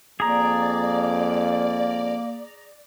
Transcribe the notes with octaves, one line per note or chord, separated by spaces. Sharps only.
F2 A#3 G#4 D5 A#5